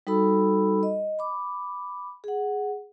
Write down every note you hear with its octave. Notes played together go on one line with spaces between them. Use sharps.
G3 D#4 F#4 A4 B5 E6
D#5
B5 D6
G#4 F#5